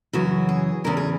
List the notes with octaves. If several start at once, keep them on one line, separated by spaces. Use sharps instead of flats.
F#2 C#3 E3 F#4
G#4
E2 C#3 E3 A#4
G#4